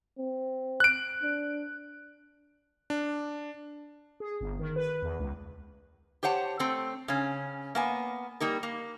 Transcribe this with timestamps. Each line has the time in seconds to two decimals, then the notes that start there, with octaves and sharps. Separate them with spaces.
0.18 C4
0.80 F#6 D7
1.22 D4
2.90 D4
4.20 G#4
4.41 G1
4.59 D#3
4.76 B4
5.02 E2
5.19 C#2
6.23 G4 C5 C#5 F#5 A5
6.59 A3 C4
7.08 C#3 C#4
7.75 A#3 B3 G#5
8.40 G3 A#3 D#4 A#4
8.63 A#3